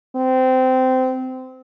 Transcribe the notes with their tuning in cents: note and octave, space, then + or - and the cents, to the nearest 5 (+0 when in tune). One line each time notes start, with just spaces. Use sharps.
C4 -20